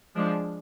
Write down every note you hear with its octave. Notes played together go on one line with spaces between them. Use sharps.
F3 G#3 D4